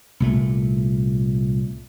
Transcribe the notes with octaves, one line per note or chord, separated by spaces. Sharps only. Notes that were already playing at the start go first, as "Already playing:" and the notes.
C2 A#2 A3